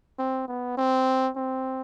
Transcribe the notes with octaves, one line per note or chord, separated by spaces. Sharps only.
C4
B3
C4
C4